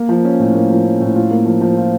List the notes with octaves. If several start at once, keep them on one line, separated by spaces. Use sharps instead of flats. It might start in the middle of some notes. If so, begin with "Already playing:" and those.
Already playing: A#3
F3
C#4
A2
A#3
F3
C#4
A2
F4
A#3
F3
F3
F4